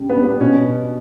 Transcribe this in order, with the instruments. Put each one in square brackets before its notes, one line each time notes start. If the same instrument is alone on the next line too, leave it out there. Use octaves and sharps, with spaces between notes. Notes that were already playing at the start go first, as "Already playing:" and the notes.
Already playing: [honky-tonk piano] C#3 G3 D4
[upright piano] B3
[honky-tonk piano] G3 D4
[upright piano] B3
[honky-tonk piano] B2 [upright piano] C#4